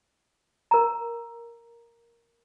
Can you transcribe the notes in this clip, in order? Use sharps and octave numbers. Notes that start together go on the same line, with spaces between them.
A#4 A#5